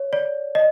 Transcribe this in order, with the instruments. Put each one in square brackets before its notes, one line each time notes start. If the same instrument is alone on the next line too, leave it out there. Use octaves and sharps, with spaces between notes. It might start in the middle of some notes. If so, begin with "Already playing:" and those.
Already playing: [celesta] C#5
D5
D#5